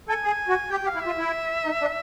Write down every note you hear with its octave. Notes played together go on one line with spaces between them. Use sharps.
A4 G#5
G#4
F#4
G4 G5
G4
F5
E4
F4 E5
E4
D#4
D4